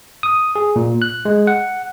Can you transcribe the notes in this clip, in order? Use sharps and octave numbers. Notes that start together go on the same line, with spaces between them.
D#6
G#4
A#2
F#6
G#3
F#5